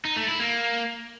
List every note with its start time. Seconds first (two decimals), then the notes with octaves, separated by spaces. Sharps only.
0.05 D#4
0.16 A3
0.28 E4
0.40 A#3